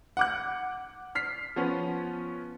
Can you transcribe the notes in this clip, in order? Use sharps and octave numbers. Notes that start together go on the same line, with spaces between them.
F#5 D6 F#6
F6 B6 C7
F3 B3 C#4